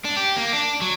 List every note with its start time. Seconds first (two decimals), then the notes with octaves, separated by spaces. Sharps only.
0.05 D4
0.17 G4
0.36 A#3
0.53 D4
0.81 F#3